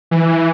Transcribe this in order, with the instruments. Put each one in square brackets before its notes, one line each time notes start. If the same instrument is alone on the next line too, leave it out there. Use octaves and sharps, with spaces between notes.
[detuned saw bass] E3